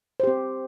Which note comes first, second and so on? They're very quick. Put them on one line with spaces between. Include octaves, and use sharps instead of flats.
C5 G4 C4